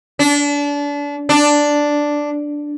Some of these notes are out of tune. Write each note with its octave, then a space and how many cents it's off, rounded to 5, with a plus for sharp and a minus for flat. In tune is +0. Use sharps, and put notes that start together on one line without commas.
D4 -30
D4 +0